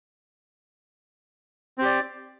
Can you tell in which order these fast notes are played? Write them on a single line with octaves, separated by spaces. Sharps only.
C4 G4 D5